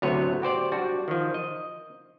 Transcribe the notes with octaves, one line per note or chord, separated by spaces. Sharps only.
D2 A2 C3 F#3 B3 C#5
F#4 G4 C5 D5
G3 D4 F#4
D#3 F3
D#5